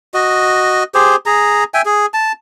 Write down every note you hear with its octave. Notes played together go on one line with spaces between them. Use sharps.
F#4 D#5
G4 G#4 C5
G#4 A#5
E5 G5 G#5
G#4
A5